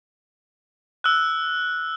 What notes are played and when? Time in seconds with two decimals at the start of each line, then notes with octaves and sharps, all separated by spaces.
1.04 E6 F#6